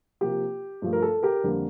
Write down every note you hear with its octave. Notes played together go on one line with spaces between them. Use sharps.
C3 F3 A#3 G4
G2 F3 A3
A#4
A4
G4 A#4
F2 D3 G3 A#3